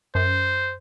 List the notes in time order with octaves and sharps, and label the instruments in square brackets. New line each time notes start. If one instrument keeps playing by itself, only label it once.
[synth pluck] F#2 [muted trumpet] C5